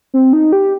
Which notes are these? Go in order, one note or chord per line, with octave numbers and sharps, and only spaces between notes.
C4
D#4
G4